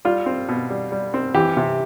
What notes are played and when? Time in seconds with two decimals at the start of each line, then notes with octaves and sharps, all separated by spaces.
0.05 G3 F4
0.26 C4
0.49 B2
0.70 G3
0.92 G3
1.14 C4
1.34 E3 G4
1.57 C3